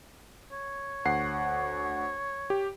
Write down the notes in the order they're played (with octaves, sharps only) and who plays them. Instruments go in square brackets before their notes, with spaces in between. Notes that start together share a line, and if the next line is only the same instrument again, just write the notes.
[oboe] C#5
[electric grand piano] D2 F#5 C7
G4